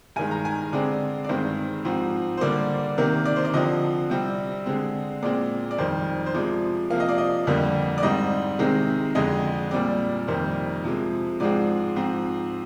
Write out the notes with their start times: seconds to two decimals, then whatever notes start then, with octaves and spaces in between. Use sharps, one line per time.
0.16 G2 D#3 G#3 G#5
0.31 A#5
0.45 G#5
0.73 D3 G#3 C4 D5
1.25 D5
1.29 G2 D#3 G#3 C4 C5
1.85 G#2 F3 C4
2.37 C5
2.41 D3 G3 A#3 D5
2.98 C3 D#3 A#3
3.25 D5
3.36 C5
3.45 D5
3.53 D3 F3 C4 D#5
4.10 C3 G3 C4
4.66 D3 G#3 C4
5.22 A#2 G#3 C4 D5
5.71 D5
5.78 F2 D#3 G3 C5
6.26 C5
6.34 C3 F3 G#3 D5
6.90 C3 F3 A#3 F5
7.00 D#5
7.09 D5
7.18 D#5
7.47 F2 D3 G3 A#3
7.98 D5
8.03 G#2 G3 C4 D#5
8.59 C3 D#3 G#3 C4
9.15 F2 D3 G#3 D#5
9.71 A#2 G3 C4 D5
10.28 F2 C3 D#3 G3 A#3 C5
10.84 C3 F3 G#3
11.40 G#2 F3 G#3 C4 D5
11.96 G#2 F3 C4